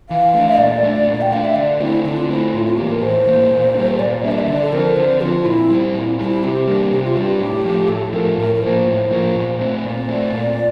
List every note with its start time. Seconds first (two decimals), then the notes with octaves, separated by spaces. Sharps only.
0.09 E3 F5
0.34 A3 D4
0.58 A#2 D5
0.83 A3 D4
1.07 A#2
1.21 G5
1.31 A3 D4 F5
1.44 E5
1.56 D3 D5
1.80 A3 C4 E4
2.04 D3 E4
2.17 F4
2.29 A3 C4 E4
2.54 A2 F4
2.66 F4
2.77 E3 A#3 G4
2.89 A#4
3.02 A2 C5
3.26 E3 A#3
3.51 A#2
3.74 D4
3.77 G3 A#3
3.99 A#2 D5
4.23 G3 A#3 D4 E5
4.32 D5
4.39 E5
4.48 D3 D5
4.62 A4
4.72 F3 C4 A#4
4.97 D3 C5
5.21 F3 C4 F4
5.45 A#2 E4
5.70 G3 C4
5.94 A#2 E4
6.19 G3 C4 E4
6.43 C3 G4
6.67 G3 A#3 D4
6.91 C3 G4
7.04 F4
7.15 G3 A#3 D4 G4
7.40 A2
7.65 F3 A3
7.88 A2 A4
8.13 F3 A3 A#4
8.38 A2 A#4
8.55 A#4
8.62 F3 A#3 C5
8.86 A2
9.10 F3 A#3
9.36 A#2
9.59 A3 C4
9.84 A#2 D5
10.08 A3 C4
10.32 A#2